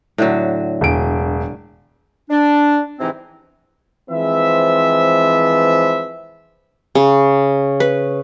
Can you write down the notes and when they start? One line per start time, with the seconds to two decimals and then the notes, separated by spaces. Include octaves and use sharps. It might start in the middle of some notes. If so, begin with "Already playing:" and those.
0.18 A2 D3 F#3
0.81 E1 D7
2.30 D4
3.00 G#2 C3 E3 C4 D#4 E4
4.10 E3 F3 G#3 C4 B4 E5
6.95 C#3
7.80 B4